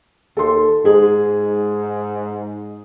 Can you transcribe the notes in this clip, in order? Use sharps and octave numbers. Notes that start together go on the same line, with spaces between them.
D#2 A4 C6
G#2 G#4